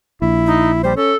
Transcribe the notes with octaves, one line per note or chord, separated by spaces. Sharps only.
A#1 E4
D#4
G3 C5
C#4 A4